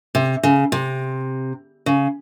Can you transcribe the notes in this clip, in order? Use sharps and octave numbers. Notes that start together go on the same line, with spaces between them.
C3
C#3
C3
C#3